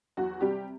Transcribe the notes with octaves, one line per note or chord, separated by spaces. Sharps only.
E2 F#3 F#4
C3 G3 G4